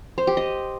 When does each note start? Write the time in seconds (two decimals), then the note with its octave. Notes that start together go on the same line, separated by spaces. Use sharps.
0.18 C5
0.27 G4
0.37 D#5